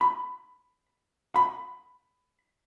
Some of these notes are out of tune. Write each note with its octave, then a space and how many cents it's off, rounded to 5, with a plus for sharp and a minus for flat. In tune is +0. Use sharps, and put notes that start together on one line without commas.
B5 +15
B5 +15